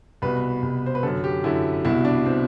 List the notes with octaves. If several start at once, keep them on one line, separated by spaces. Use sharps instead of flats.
C2 B2 B4
C2 B2
C5
B4
F#2 D3 A4
G4
F#2 D3 E4
C2 B2 E4
D4
B2 C4